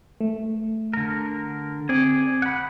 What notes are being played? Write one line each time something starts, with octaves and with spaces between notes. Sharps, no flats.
A3
D3 A#4
C4 G#4 D5
F#5 B5